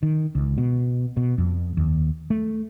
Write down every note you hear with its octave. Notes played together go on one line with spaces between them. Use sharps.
D#3
C#2
B2
B2
F2
D#2
A3